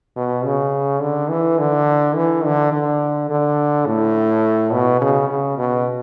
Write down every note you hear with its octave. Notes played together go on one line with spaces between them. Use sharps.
B2
C#3
D3
E3
D3
E3
D3
D3
D3
A2
B2
C#3
C#3
B2